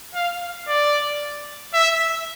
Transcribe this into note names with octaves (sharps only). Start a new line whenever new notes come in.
F5
D5
E5